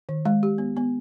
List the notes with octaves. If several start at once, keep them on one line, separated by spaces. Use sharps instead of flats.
D#3
G#3
G4
B3
B3